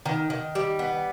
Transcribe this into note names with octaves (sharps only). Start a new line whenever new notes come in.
D#3
D#3
G3
B3